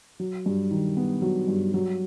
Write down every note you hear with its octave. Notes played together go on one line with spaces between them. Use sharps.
F#3
G2
D#3
B3
F#3
G2
F#3